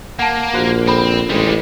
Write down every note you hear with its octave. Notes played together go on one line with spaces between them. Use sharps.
A#3 F#5 A5
A#1 F#4 C5
C4 A4 B5
A1 G3 G#3